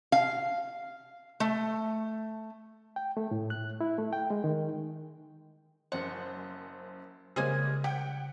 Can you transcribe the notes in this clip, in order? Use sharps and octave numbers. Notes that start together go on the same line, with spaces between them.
F5
A3
G5
A3
A2
F#6
E4
A3
G5
G#3
D#3
F#1 F#2 C5 F#5
C#3 G3 G#3 A#3 G#4 C5 G#5
G4 F#5 G5